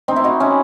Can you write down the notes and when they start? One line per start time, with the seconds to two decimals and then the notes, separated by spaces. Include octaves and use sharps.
0.08 C4 D#4
0.16 E4
0.24 D#4 F#4
0.40 C#4 E4